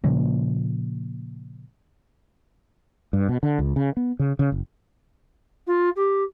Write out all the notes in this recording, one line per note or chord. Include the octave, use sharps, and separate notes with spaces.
A#2 C#3 F3 A#3
G2
B2
D3
C#2
C#3
B3
C#3
C#3
F#1
F4
G4